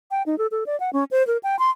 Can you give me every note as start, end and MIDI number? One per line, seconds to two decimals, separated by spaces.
0.11 0.23 79
0.26 0.38 63
0.38 0.47 69
0.51 0.64 69
0.66 0.78 74
0.80 0.90 78
0.93 1.04 61
1.11 1.25 72
1.27 1.37 70
1.43 1.58 79
1.59 1.70 84